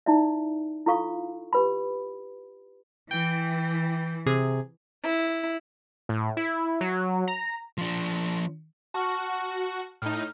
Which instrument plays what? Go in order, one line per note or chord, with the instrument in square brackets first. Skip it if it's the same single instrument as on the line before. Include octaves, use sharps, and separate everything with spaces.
[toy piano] D#4 E4 D5 E5
E4 F4 A4 F5 C#6
G4 B4 B5
[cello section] E3 [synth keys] G5
[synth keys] C3 G#4
[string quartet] E4
[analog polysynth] A2
E4
F#3
A#5
[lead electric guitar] F3 D4
[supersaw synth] F#4 [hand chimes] A5 C#6 F6
[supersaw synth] A2 D#4 [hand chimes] F6